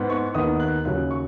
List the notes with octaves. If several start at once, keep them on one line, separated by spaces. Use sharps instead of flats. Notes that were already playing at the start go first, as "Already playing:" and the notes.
Already playing: G#2 B3
C#6
D#2 D#3 B3 D#6
F#6
D#2 C#3 F#3 F#6
C#6